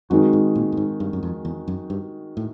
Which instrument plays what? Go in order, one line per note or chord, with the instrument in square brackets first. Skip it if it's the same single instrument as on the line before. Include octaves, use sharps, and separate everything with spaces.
[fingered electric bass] F#2 [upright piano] D#3 G#3 C4 D#4 F#4
[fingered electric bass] G#2
A#2
A2
G#2
G2
F#2
F2
E2
F#2
G2
A2